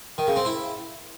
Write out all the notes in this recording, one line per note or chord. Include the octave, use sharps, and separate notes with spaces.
D#3
C#3
C4
E4